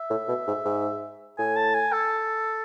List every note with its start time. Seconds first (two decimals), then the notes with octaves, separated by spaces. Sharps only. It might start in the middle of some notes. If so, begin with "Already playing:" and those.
Already playing: E5
0.10 A2
0.28 B2
0.47 G#2
0.65 G#2
1.38 A2 G#5
1.56 A5
1.74 G#5
1.93 A4